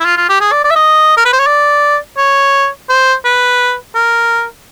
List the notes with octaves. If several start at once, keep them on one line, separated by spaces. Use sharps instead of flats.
E4
F4
F4
G4
G#4
D5
D5
E5
D#5
A#4
B4
C5
C#5
D5
C#5
C5
B4
A#4